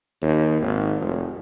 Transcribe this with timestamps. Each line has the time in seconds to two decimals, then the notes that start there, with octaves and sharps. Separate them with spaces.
0.22 D#2
0.62 G#1
1.00 F1